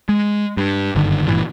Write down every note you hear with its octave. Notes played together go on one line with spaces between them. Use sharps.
G#3
G2
F#1 G2 D3 D#3
G#1 G2 A#2 E3